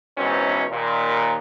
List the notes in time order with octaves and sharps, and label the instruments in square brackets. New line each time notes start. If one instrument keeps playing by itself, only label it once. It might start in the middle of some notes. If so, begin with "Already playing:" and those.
[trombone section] C#2 G#2 B2 E3 C4 C#4
D#2 A#2